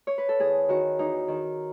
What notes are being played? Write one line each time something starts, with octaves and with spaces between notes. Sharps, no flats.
C#5
B4
A4
E2 G#4
D#3 F#4
E2 D#4
D#3